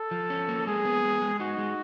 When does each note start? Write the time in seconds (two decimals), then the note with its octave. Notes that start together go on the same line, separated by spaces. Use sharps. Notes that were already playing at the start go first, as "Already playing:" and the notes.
Already playing: A4
0.11 F3
0.30 C#4
0.49 A#3
0.67 G#3 G#4
0.85 B3
1.04 G#3
1.22 G#3
1.40 D#4 F#4
1.58 G#3